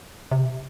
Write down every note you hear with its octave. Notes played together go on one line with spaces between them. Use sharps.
C3